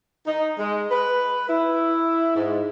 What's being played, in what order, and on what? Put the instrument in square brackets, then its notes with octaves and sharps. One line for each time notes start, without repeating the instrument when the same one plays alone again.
[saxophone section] D#4
G#3
B4
E4
G#2